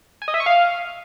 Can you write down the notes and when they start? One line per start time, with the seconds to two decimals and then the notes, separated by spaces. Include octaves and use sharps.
0.22 G#5
0.28 D#5
0.34 E5
0.40 C#6
0.46 F5